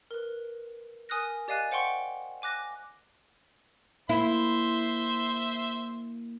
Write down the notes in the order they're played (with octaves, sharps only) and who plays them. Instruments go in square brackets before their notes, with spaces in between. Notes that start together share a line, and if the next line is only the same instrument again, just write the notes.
[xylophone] A#4 B4
A#4 G#5 D#6 F6 F#6 A#6
G4 D5 D#5 F5 G#5 F#6
C5 F#5 G5 C6 C#6
G#5 D6 F#6 A#6
[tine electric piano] A#3 [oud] E4 [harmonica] C5 E5 C6